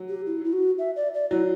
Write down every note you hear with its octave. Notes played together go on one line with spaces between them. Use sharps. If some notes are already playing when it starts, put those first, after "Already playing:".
Already playing: F#3
G4
E4
E4
F#4
E5
D5
D5
F#3 E4